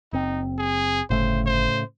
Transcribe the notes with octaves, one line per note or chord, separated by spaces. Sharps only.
F#1 C4 D#4
G#4
G1 A2 C#3 A3 C5
C5